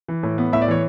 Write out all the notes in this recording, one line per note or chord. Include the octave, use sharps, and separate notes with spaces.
E3
A2
B3
A2 E5
D5
E3 C#5